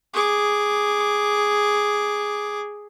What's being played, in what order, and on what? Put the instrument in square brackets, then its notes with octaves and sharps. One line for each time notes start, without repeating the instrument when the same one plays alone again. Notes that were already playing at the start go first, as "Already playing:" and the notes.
[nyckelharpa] G#4 D6